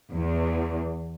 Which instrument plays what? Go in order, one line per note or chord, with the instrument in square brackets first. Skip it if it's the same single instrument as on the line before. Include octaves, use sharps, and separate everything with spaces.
[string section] E2